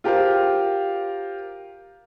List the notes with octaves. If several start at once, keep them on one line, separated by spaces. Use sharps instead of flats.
F4 G4 A#4 C5 F5